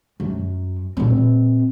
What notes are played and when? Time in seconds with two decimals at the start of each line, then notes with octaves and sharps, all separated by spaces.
0.20 F#2
0.97 A#2 C4